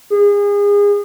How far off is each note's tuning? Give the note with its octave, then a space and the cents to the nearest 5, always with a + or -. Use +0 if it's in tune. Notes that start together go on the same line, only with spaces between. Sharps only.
G#4 -30